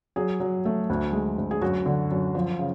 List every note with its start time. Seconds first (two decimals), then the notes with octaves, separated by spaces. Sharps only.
0.16 F#3 G#4
0.40 F#3
0.65 A3
0.90 D2
1.13 G#3
1.38 D2
1.51 G#4
1.61 F#2 F#4
1.86 D3
2.11 F#2
2.35 F3
2.59 C#3